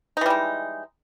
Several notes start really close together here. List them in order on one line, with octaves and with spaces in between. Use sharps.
D#4 E3 G3 G#3